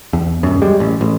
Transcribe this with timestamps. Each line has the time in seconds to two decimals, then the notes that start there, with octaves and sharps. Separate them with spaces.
0.13 E2
0.43 D#1 F#2
0.62 G3 G#3
0.80 A1
1.01 A1